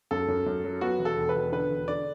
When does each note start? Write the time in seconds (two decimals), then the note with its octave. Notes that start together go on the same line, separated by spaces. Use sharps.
0.11 F#2 A4
0.28 F#2
0.46 F#2
0.64 F#3
0.81 B3 F#4
0.99 E1
1.05 A4
1.18 E1
1.29 B4
1.35 E1
1.52 D3 B4
1.71 E1
1.88 D3 D5